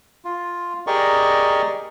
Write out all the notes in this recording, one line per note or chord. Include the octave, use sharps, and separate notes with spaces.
F4
G4 G#4 A#4 D5 D#5 C#6